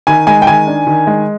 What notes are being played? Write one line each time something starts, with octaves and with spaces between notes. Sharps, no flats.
D#3 G#5
G#3 G#5
G5
D#3 G#5
D4
D#3
G#3